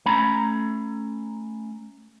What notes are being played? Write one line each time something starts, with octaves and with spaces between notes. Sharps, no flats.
A3 C#4 A#5 B5